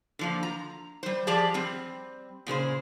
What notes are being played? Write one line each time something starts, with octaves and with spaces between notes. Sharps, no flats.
D3 F3 A#3
A#5
G3 C5
F3 G4 G#4 D5 A5
G3 C4
A#2 C#3 G#4 C5